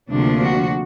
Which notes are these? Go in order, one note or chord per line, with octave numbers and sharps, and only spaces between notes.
D2 C3 F3 A#3 D4
F#4